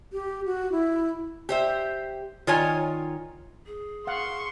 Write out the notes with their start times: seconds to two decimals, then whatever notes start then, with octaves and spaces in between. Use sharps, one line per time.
0.13 G4
0.46 F#4
0.72 E4
1.49 G4 C5 E5
2.47 D#3 F4 C#5 G#5
3.67 G#4
4.07 F5 F#5 C6 C#6